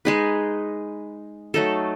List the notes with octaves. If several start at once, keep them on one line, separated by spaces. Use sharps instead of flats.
G#3 D#4 G#4 B4
F#3 A3 D#4 A4